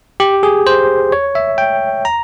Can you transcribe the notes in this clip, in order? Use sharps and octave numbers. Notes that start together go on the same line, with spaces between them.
G4
G#4
C5
C#5
E5
G5
A#5